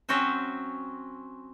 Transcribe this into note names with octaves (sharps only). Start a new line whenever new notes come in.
F#3 C4 C#4 F#4 C5 E5